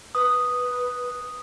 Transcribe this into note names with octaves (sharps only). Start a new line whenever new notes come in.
B4 D#6